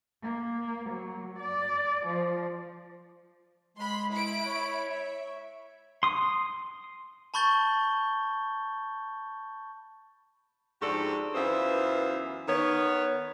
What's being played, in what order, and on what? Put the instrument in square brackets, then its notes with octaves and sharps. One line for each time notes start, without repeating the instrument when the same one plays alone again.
[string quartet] A#3
F#3
D5
F3
[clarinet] G#3 [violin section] B5 C6
[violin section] E4 B5 D7
[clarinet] C#5
[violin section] E5
[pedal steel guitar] C6 D#6
[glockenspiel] A5 B5 C#6 G6 A6 G7
[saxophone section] G#2 F3 D4 F#4 G4 A4
F#2 E3 B3 F4 C5 E5
D#3 B3 C#5